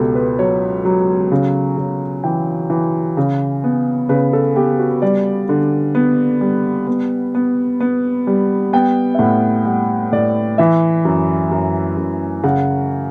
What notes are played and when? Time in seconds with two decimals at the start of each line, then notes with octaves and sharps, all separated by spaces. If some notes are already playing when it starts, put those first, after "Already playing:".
Already playing: C#2 B2 G4 A4
0.15 B4
0.39 F#3 C#5
0.85 F#3
1.32 C#3
1.78 C#3
2.24 E3 G5
2.70 E3
3.17 C#3
3.64 B3
4.09 C#3 B4
4.33 A4
4.55 B3 G4
4.79 F#4
5.02 G3 D5
5.49 D3
5.95 B3
6.41 G3
6.87 B3
7.35 B3
7.80 B3
8.27 G3
8.73 B3 G5
9.15 E5
9.19 A2 F#5
9.65 G3 F#5
10.12 A2 D5
10.58 E3 E5
11.05 F#2
11.51 F#2
11.97 F#2
12.43 C#3 F#5